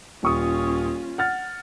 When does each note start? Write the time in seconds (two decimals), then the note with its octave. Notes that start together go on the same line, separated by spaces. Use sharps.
0.23 D#1 C#4 F4 C#6 D#6
1.18 F#5 F6 A6